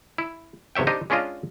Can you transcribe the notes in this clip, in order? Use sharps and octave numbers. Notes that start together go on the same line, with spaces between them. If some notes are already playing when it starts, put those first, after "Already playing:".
E4
B1 C3 C#5 E5 G5
C4 D4 D#4 G4 D#5
G#3 C#4 D4 F4 D#5